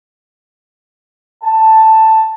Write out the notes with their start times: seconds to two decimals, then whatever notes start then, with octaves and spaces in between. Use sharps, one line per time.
1.43 A5